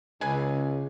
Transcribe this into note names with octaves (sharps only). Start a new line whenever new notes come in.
C#2 C#3 G#4 B4 G#5